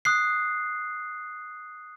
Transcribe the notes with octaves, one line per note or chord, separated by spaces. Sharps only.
D#6 F#6 C7